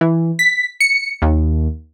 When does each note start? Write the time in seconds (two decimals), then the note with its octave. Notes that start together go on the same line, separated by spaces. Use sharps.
0.01 E3
0.39 B6
0.80 C#7
1.22 D#2